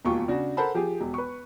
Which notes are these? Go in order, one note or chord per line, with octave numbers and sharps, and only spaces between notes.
E1 D#2 F4 C#6
C#3 D4 F#4
A4 A#4 C5 F#5 A5 B5
F3 G4 G#4
E1
B4 C#6